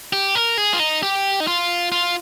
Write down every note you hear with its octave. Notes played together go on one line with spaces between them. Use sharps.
G4
A#4
G#4
F4
D#4
G4
D#4
F4
F4